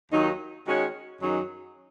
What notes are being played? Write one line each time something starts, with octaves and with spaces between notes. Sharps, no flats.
D#2 D#3 F#3 D#4
D#3 G#3 C#4 F#4 C#5
F#2 D#3 F#3 D#4 G#4